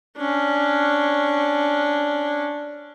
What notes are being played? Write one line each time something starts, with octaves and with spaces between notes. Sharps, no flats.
C#4 D4